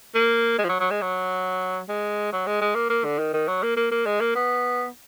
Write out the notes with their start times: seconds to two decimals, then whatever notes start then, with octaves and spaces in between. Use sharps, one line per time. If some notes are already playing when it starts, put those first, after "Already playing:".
0.15 A#3
0.58 G#3
0.64 F3
0.69 F#3
0.80 F#3
0.91 G#3
1.02 F#3
1.89 G#3
2.32 F#3
2.47 G#3
2.61 G#3
2.75 A#3
2.90 A#3
3.04 D3
3.19 D#3
3.34 D#3
3.48 F#3
3.63 A#3
3.77 A#3
3.91 A#3
4.06 G#3
4.21 A#3
4.35 B3